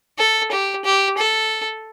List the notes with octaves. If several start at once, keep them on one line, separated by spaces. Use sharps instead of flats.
A4
G4
G4
A4